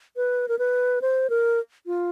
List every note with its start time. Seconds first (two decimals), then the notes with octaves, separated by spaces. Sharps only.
0.16 B4
0.48 A#4
0.59 B4
1.02 C5
1.30 A#4
1.86 F4